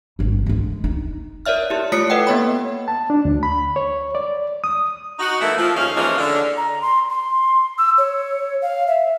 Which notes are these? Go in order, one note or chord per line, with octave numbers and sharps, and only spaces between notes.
G#1 G2
D3 G#3
D#4
A#4 C#5 D5 E5 F6
E4 G4
A3 F4 C#5 D#6 C7 C#7
A4 B4 D#5 F#5 G5
A#3 B3 C#5 B5
A5
D4
D2
B5
C#5
D5
D#6
D#4 F#4
E3 A3 A#3 E4
F3
D#2 F3 G#3 A3 C#4 F5
E3 F3 G#3 A#3 C#4
D3
A#5
C6
C6
E6
C#5
F5
E5